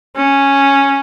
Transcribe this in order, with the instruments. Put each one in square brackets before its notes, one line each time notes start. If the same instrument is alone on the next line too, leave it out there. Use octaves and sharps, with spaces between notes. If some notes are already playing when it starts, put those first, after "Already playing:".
[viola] C#4